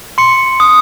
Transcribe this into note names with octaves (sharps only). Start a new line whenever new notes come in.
C6 C#7
D#6